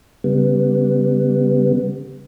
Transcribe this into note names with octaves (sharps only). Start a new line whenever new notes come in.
C#3 G3 B3